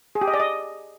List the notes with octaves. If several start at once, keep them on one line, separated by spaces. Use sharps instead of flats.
G#4
G4
D#5
D5
D#5